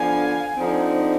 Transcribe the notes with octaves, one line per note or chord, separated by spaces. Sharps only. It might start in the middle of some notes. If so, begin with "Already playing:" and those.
Already playing: D3 F3 B3 D4 F5 G#5
D3 F3 C4 D#4